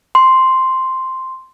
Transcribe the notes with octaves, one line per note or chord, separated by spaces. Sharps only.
C6